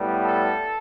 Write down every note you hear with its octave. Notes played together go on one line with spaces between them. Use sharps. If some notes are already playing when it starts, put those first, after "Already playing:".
Already playing: A2 G3 B3
A4